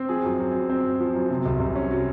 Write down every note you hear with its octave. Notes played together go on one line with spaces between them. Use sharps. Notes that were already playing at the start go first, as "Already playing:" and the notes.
Already playing: C4
F3 G#4
F#2
F#2
F#2
C4
F#2
F3
F#2
C3
C2
C2
C#4
F#3